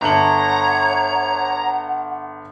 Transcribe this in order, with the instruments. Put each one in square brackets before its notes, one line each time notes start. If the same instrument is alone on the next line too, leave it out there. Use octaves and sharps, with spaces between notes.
[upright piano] G1 A4 F#7 [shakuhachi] C#5 [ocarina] F#5 [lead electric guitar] A#5